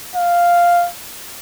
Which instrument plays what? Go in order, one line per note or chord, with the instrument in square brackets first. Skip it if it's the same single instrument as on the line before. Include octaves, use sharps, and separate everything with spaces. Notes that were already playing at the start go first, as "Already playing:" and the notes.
[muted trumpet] F5